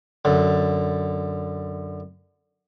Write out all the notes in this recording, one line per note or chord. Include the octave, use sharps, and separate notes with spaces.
F#2 D3